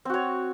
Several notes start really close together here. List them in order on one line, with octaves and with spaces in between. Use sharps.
C4 F#4 C#5